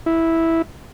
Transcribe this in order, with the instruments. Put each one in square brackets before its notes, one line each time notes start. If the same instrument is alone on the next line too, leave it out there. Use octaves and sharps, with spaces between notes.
[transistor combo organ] E4